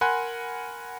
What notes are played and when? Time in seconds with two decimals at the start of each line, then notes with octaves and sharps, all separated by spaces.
0.01 A#4 F#5 G#5 B5 C6 F#6